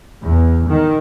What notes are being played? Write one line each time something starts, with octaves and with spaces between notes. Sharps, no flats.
E2
D#3